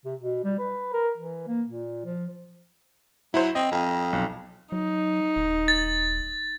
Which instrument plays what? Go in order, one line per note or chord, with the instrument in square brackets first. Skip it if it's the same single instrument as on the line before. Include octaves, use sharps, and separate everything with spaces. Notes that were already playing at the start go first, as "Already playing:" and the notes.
[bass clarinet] C3
B2
G3
B4
A#4
E3
A#3
A#2
F3
[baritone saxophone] F#3 [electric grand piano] E4 C5
[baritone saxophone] C4 [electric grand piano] D#5
[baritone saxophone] F2
[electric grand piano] B1
[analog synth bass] F#3 [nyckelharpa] D#4
[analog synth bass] D#1
[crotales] A6